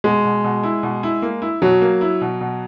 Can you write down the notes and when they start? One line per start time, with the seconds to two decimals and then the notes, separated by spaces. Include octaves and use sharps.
0.04 B2 G#3
0.25 B2
0.44 B2
0.63 E4
0.83 B2
1.03 E4
1.22 A#3
1.42 E4
1.62 B2 F#3
1.82 A#3
2.01 E4
2.21 B2
2.41 B2